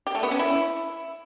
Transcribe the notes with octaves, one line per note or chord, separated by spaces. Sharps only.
G4
A3
B3
C#4
E4